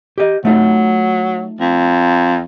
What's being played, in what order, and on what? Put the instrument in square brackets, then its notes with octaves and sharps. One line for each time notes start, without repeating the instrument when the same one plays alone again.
[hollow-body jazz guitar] G4 D#5
[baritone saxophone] F#3 [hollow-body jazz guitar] A3 D#4 F4
[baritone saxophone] F2